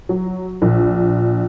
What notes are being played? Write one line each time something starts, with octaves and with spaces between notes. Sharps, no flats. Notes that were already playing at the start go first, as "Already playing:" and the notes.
F#3
A#1